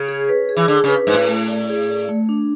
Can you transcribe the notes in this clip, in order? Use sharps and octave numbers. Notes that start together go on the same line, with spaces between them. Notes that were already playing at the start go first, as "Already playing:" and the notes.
Already playing: C#3
G#4
B4
G#4
E3
D3 G#4
C#3 B4
G#2 B4
A2
A3
D5
G#4
D5
A3
D4